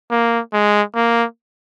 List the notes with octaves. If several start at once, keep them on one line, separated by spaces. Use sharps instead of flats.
A#3
G#3
A#3